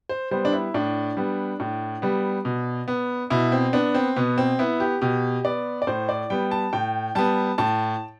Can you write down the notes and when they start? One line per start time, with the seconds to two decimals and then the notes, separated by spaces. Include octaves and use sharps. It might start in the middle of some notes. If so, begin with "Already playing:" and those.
0.09 C5
0.31 G3 B3 C5
0.45 D4
0.53 E4
0.74 A2 D4
1.17 G3 B3
1.60 A2
2.02 G3 B3
2.45 B2
2.88 B3
3.30 B2 E4
3.52 C4
3.73 B3 D4
3.94 C4
4.16 B2 B3
4.38 C4
4.59 B3 E4
4.80 G4
5.01 B2 G4
5.45 B3 D5
5.82 D5
5.87 A2 C5
6.09 D5
6.30 G3 B3 G5
6.51 A5
6.73 A2 G5
7.15 G3 B3 A5
7.58 A2 A5